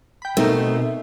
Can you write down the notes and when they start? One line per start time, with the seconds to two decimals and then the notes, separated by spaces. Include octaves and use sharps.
0.22 G5 B5
0.37 B2 A3 C4 D#4 A#4